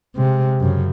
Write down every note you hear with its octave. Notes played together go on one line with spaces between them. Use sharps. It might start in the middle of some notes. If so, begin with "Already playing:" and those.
C3 G#3
F#2 C#3